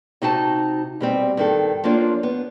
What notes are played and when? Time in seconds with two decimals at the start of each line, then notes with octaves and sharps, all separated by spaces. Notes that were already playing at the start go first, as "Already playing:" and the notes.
0.22 C3 D#4 F#4 F5 A5
1.00 B2 G3 C4
1.37 G2 D#3 A4
1.84 F3 A#3 C#4 D4 F4
2.23 B3